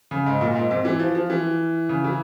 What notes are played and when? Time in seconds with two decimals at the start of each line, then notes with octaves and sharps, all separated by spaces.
0.11 C#3
0.26 G#2
0.41 A#2
0.55 G#2
0.71 C3
0.85 E3
0.99 F3
1.15 F3
1.30 E3
1.89 C#3
2.04 E3